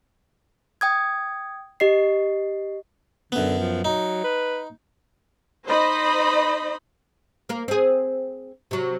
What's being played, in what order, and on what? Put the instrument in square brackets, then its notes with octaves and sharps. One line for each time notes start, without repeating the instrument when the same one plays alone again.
[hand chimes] G5 D#6 G#6
G4 D#5 C7
[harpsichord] F#2 B3 [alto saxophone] D3
[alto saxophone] F3
[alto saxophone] F#3 [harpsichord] D#4
[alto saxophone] B4
[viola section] D#4 C5 D#5 B5
[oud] A#3 A#4
C4 G#4
C3 F#3